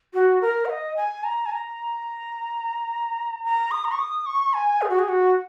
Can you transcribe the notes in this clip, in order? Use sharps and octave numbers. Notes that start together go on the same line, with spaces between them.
F#4
A#4
F#5
D#5
G#5
A#5
G#5
A#5
A#5
D#6
A#5
C#6
D#6
C#6
G#5
G#4
F#4
G#4
F#4